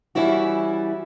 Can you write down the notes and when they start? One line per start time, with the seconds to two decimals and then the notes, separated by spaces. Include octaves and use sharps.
0.15 E3 G3 C#4 E4 F#4